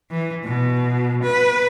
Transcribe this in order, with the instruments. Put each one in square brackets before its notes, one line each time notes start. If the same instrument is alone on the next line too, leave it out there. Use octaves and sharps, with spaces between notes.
[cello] E3
B2
B4